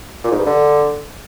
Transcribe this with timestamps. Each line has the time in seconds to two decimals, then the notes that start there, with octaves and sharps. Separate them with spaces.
0.24 A#2
0.31 G#2
0.39 G2
0.46 D3